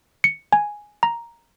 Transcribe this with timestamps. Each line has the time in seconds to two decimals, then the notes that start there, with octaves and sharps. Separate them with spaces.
0.24 C#7
0.53 G#5
1.03 A#5